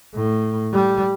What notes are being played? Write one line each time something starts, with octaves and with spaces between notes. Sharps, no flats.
A2
G3